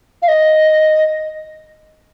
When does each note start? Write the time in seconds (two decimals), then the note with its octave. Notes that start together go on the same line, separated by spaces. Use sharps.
0.22 F5
0.28 D#5